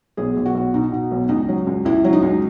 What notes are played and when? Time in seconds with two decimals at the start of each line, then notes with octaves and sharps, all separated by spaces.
0.17 B1 G#4
0.36 B1
0.46 F#4
0.54 B1
0.74 B2 D#4
0.92 B2
1.11 B1
1.29 C#2 D#4
1.49 F#3
1.67 C#2
1.85 C#2 E4
2.04 F#3
2.13 D#4
2.23 C#2